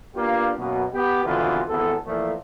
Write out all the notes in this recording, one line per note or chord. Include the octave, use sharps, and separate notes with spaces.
A#3 B3 D4 F4 G4
F#2 B2 A#3
B3 G4
G#1 F2 B2 D3 E3 F4
G#1 E2 B3 A4
A#2 E3 F3 A3